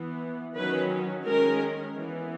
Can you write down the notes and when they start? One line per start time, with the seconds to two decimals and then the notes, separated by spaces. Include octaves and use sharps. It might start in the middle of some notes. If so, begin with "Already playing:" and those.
Already playing: E3 B3
0.56 D#3 F#3 C#4 B4
1.25 D#3 G#3 C#4 A#4
1.95 E3 B3